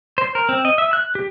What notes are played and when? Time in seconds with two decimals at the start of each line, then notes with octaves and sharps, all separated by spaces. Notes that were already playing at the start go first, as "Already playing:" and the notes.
0.18 C5
0.35 A#4
0.49 C4
0.65 D#5
0.78 E5
0.93 F#6
1.15 G4